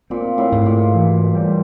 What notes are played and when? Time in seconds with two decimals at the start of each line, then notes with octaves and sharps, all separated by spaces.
0.10 A#2 C4
0.38 A2
0.52 G#2
0.66 A#2
0.94 E3
1.35 G3